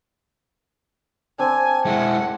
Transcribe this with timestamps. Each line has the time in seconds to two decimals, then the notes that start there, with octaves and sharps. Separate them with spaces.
1.39 C4 D4 G#5
1.85 G#3 E4 F#5